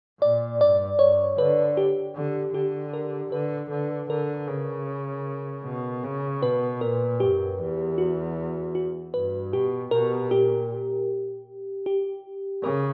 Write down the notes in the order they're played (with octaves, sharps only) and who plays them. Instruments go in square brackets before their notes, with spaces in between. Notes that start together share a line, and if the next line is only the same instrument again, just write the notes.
[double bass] A#2 [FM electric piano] D5
[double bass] G2 [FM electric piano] D5
[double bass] G2 [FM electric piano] C#5
[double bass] D3 [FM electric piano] B4
[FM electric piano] G4
[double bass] D3
[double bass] D3 [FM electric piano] G4
[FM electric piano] A#4
[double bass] D3 [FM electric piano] B4
[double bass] D3
[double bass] D3 [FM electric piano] A#4
[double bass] C#3
B2
C#3
[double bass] B2 [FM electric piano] B4
[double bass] A#2 [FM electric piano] A#4
[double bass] F#2 [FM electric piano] G4
[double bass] E2
[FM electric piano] F#4
F#4
[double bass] G2 [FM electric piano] B4
[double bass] B2 [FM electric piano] G4
[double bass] B2 [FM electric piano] A#4
[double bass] A#2 [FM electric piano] G4
[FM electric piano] G4
[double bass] C#3 [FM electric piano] A#4